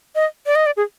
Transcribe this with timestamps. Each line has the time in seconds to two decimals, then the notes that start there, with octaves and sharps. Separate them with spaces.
0.15 D#5
0.46 D5
0.55 D#5
0.66 D5
0.77 G#4